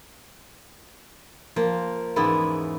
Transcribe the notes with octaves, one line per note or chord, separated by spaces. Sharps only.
F3 A#3
E2 G#2 C#3 B3 E4 D5